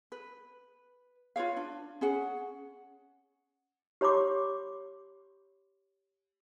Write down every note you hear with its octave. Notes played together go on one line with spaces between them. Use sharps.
B4
F4 B4 C#5 F5
D4
C#4 G#4 F#5
G4 C#5 B5 C6 D6